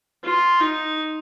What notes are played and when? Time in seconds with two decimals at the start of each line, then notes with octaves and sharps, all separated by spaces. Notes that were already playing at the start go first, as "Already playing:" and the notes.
0.24 F4
0.61 D#4